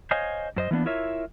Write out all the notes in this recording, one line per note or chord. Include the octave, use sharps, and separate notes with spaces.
C5 C#5 D#5 F5 G#5
F#2 C5 D#5
E3 A#3 B3 D4
E4 F4 A#4 C#5 E5